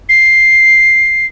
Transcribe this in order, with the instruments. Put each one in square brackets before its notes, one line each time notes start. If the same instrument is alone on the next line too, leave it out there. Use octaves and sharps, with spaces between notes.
[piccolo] C7